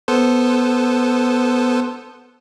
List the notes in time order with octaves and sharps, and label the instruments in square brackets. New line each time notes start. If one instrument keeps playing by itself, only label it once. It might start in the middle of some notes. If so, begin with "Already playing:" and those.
[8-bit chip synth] B3 A4 C5